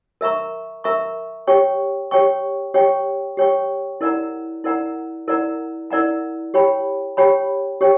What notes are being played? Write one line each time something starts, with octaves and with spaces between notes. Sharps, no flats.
A#4 E5 A#5 C#6
A#4 E5 A#5 C#6
G4 C#5 G5 C#6
G4 C#5 G5 C#6
G4 C#5 G5 C#6
G4 C#5 G5 C#6
E4 A#4 D5 F#5 A#5
E4 A#4 D5 F#5 A#5
E4 A#4 D5 F#5 A#5
E4 A#4 D5 F#5 A#5
G4 C#5 G5 B5
G4 C#5 G5 B5
G4 C#5 G5